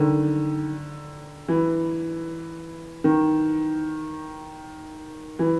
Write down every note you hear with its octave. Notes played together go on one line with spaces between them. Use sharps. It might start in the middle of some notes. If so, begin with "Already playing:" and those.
Already playing: D3 D#3
E3
D#3
E3